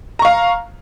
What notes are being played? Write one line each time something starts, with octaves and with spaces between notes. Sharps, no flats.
F5 A#5 C#6